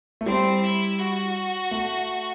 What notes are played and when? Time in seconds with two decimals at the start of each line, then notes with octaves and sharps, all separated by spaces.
0.21 A3
0.26 G3 C4
0.63 E4
0.99 F#4
1.71 A3